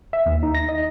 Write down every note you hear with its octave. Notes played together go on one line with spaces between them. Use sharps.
E5
D#2
D#4
A#6
D#5